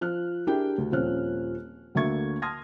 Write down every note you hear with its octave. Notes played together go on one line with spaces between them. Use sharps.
F3 F6 F#6
D4 E4 G4 G#4 A#4 G5
D2
D#1 F3 C4 C#4 F6 F#6
D2 D3 A#3 E5 C#6 G#6
A5 C6 D#6 F6 G#6 A#6